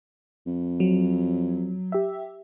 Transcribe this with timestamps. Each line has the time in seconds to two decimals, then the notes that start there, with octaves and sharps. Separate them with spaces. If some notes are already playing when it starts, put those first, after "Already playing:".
0.47 F2
0.80 F#3
1.92 G4 E5